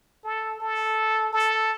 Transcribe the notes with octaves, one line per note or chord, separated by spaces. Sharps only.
A4
A4
A4